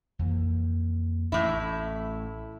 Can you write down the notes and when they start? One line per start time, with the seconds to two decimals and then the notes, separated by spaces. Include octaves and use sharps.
0.19 F2 E3 A#3
1.32 A1 A2 E4